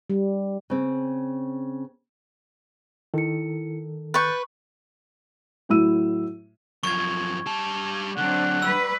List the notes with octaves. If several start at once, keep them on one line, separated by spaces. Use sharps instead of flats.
G3
C#3 C4
D#3 E4 A4 C#7
B4 C#6 G6 A6
A2 F#3 E4 E6 D#7
F#2 F3 C#6 G#6
G3 A5
D3 F#3 C4 D4 F#5
G3 B4 E6